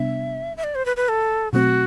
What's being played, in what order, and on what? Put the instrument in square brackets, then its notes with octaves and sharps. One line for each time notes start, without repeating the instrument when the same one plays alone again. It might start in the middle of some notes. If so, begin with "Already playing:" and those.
Already playing: [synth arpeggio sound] C3 G3 B3 D4 [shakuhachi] E5
[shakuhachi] E5
D5
C5
B4
B4
A4
[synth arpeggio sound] B2 F#3 A3 C4 [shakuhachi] F#4